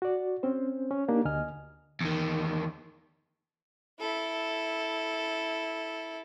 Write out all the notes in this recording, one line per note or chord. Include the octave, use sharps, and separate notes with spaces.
F#4 D5
C4 C#4 C5
C#4
A#3 D4 D#4 G4
D2 D3 D#5 G#5 F6
E2 D#3
E4 A4